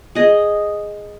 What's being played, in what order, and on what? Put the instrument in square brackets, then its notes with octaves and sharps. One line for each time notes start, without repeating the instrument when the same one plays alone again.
[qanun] G#4 D#5